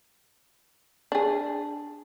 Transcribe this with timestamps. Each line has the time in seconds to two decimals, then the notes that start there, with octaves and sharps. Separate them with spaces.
1.12 D4 G#4